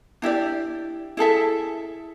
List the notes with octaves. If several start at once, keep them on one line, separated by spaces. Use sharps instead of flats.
D4 E4 G4 D5
E4 G#4 A4 E5